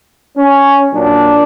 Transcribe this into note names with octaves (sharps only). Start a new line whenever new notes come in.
C#4
A#2 F#3 A#3 D4